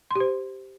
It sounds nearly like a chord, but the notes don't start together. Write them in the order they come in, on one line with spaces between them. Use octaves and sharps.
C6 G4 C5